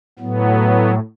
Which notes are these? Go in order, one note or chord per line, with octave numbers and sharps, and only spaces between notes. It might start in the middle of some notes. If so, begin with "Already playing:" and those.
A2 F#3 B3